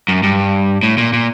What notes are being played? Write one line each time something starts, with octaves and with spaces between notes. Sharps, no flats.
F#2
G2
A2
A#2
A#2